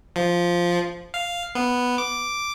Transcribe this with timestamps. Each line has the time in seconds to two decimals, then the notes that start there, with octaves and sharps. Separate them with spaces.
0.16 F3
1.14 F5
1.55 B3
1.98 D6